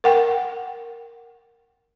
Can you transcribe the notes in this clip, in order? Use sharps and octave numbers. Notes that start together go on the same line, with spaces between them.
A#4 F#5 G5